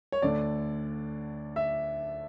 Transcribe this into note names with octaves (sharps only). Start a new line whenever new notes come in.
C#5
D2 D3 D5
E5